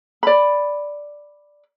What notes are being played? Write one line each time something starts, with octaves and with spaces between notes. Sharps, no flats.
D5 B5